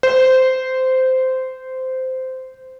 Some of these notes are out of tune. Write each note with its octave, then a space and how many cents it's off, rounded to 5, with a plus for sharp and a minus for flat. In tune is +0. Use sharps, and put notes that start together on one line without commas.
C5 -15